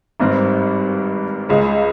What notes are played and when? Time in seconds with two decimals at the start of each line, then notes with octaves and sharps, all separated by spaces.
0.20 G#1 G2 D#3 G3 C4
1.49 C#2 C#3 G#3